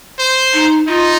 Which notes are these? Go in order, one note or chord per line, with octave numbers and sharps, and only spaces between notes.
C5
D#4
D#4 F4